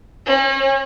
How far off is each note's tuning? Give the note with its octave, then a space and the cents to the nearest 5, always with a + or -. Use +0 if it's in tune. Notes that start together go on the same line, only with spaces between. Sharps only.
C#4 -40